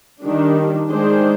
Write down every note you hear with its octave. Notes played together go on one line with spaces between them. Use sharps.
D#3 G3 D4
D#3 G#3 D4 G#4 C5